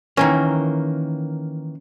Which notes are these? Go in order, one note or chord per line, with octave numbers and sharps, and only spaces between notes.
D#3 E3 A#3 C#4